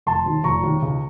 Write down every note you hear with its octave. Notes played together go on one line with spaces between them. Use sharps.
F1 A5 C6
D#2 D#3
F1 A#5 C#6
D#2 D#3
C#2